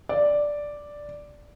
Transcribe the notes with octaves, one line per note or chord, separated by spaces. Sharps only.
D5